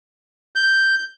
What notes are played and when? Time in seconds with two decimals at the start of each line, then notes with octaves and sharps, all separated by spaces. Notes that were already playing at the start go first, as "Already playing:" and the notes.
0.56 G6